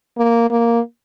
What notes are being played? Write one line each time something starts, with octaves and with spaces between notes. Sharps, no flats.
A#3
A#3